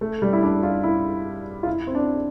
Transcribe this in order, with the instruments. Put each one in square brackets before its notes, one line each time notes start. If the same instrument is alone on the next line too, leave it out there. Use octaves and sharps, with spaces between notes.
[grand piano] A3
G3
E4
D4
F4
E4
F4
E4
C4
D4